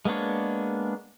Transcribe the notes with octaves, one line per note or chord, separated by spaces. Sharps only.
G#3 A#3 B3 D4 C#5